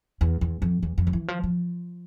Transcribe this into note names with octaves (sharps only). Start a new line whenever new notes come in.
E2
E2
F2
E2
F2
F3
E3
F3
F3